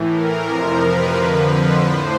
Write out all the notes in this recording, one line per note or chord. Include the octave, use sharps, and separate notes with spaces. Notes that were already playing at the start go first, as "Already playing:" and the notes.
Already playing: A2 E3
A#4
F2 C3 F3
B4
F2 D3 F3
A2 C5